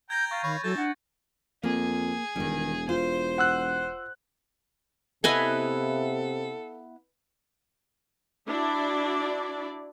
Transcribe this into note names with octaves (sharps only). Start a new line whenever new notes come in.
G5 A#5 G6 G#6 A#6
F5 C#6 G6 A6
D#3 C#5 B5
E3 F#3 A4 A5 G6 A6
D4 F#5
F2 A#3 G#4
E1 D#3 G3
F4 C5
F#5 E6 F#6
C3 B3 E4 A4 B4 D#5 F5 G#5
D4 E4 F#4 D5